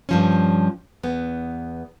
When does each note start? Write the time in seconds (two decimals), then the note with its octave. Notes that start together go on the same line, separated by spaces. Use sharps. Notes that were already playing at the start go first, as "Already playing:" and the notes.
0.09 G2 F3 C#4
1.03 E2 B3